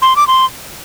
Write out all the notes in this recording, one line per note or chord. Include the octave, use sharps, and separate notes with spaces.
C6
D6
C6